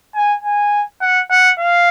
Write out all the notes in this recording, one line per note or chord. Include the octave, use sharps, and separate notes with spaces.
G#5
G#5
F#5
F#5
F5